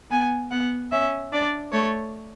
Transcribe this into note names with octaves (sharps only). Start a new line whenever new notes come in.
B3 G#5
B3 F#5
C#4 E5
D4 D5
A3 C#5